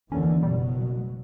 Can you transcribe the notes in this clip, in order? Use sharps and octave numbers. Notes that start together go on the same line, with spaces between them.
D#2 D3 E3 C#4
F#1 B2 F#3 G3